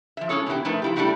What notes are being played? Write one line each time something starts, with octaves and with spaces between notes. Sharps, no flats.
F3 E5
G#3 C#4 E4 A4 C#5
B2 D#3 E4 F#4 G4
F3 A3 D#4 A#4 B4 E5
F3 E4 G4
G3 A3 D4 E4 F#4 G4